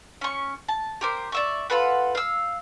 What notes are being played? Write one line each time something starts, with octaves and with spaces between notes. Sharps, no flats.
C#4 C#6
A5
G4 A#4 C5
D5 E5 C#6
F4 A4 B4 F#5
F5 E6